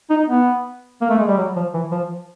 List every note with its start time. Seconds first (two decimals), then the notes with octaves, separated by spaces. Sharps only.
0.10 D#4
0.28 B3
1.01 A#3
1.10 A3
1.19 G#3
1.28 G3
1.37 F#3
1.56 F3
1.74 E3
1.92 F3